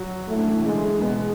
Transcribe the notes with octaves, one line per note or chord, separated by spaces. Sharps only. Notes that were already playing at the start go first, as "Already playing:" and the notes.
Already playing: F#3 F#4
A3 E4
D4
E3 E4
D3 G#3 D4
B2 G#3 B3